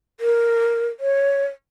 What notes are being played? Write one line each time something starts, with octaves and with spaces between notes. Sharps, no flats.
A#4
C#5